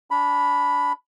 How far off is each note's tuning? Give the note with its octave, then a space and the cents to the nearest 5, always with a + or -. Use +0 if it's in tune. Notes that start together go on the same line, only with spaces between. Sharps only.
D4 -25 B5 +0